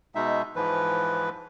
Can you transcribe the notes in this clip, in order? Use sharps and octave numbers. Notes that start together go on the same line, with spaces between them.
B2 G#3 D#4 E5
G#2 E3 F3 B4